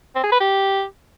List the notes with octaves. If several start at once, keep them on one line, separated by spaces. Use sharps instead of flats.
C4
G#4
B4
G4